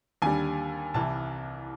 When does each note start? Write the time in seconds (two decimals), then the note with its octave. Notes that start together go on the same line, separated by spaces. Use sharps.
0.22 D#2 D3 G3 G#5
0.94 C2 C3 E3 A5